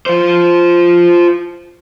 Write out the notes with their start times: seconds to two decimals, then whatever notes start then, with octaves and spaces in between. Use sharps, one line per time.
0.06 F4 C5